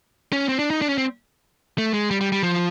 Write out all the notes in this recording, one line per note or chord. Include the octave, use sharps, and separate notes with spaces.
C#4
C4
D4
D#4
D4
C#4
C4
A3
G#3
G3
G3
G3
F3